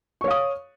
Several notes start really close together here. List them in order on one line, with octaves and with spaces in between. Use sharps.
C#6 C#5 F5 D#6